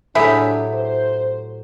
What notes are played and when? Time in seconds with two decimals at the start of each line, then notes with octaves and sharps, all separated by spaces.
0.15 A2 F#3 D4 E4 G4 G#4 E5
0.72 C5